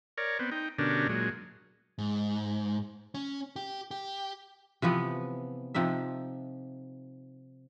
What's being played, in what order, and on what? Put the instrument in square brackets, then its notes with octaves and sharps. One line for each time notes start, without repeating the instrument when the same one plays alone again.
[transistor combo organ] A#4 C#5 D5
B3 C4
D#4 G5
B2 D3 C#4 D4 G4 A#4
A#2 F#3 G#3
[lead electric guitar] G#2
C#4
G4
G4
[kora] C3 E3 F3 B3
C3 F3 D#4 E5